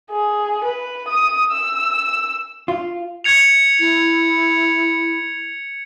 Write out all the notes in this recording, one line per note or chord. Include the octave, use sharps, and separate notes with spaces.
G#4
B4
D#6
E6
F4
G#6 C#7 F7
E4